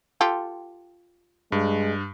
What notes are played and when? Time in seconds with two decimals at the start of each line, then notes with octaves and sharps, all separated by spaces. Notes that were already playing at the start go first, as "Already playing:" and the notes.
0.21 F4 G4 A4
1.52 G2 G#3